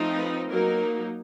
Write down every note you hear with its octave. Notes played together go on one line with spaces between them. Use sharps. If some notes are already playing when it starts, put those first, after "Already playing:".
Already playing: F3 A3 C4 D#4
B4
F#3 A#3 D#4 A#4